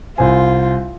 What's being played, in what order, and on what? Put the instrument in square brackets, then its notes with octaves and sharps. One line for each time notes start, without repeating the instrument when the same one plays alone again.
[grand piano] C2 C5 G#5 [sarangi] F4